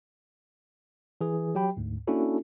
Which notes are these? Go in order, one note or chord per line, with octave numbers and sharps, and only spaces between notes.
E3 G#4
F#3 G4 G5 B5
D2 G#2
A#3 C#4 D4 E4 F#4 A4